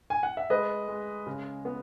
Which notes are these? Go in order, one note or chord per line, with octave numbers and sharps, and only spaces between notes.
G#5
F#5
E5
G#3 B4 D#5
G#3
C#3
B3